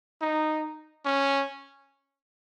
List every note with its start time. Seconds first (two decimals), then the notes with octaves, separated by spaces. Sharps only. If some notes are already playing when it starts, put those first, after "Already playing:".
0.21 D#4
1.05 C#4